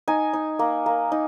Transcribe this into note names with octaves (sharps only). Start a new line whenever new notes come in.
D#4 G#5
D#4
A#3
A#3
D#4